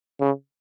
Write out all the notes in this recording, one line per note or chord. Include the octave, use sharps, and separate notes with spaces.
C#3